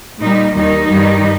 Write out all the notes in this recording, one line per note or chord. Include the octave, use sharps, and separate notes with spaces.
A#2 G3 D#4
D#2 D#3 G3 D#4
G2 D#3 G3